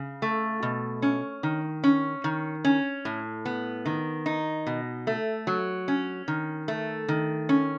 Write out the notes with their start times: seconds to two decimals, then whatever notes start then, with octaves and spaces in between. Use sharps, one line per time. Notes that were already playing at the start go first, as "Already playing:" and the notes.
Already playing: C#3
0.22 A3
0.63 B2
1.02 C#4
1.43 D#3
1.84 C#4
2.24 D#3
2.65 C#4
3.05 A2
3.45 B3
3.86 D#3
4.26 D#4
4.67 B2
5.07 A3
5.47 F#3
5.88 C#4
6.28 D#3
6.68 A3
7.08 D#3
7.49 C#4